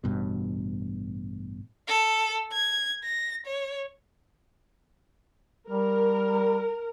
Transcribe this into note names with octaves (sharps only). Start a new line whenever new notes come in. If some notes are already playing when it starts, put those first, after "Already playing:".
A1 G2 B2
A4
G#6
A#6
C#5
G3 A#4